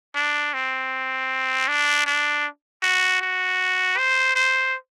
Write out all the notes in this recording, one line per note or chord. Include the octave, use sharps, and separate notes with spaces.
D4
C4
D4
D4
F#4
F#4
C5
C5